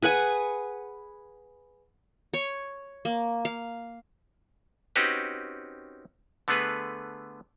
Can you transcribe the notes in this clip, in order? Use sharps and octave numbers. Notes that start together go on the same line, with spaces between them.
G#4 B4 F#5 G#5
C#5
A#3
F5
C4 C#4 D#4 F#4 G4 B4
D3 A3 B3 G#4 B4